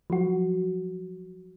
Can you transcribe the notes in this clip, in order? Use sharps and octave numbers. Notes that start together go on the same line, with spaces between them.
F3 F#3 F#4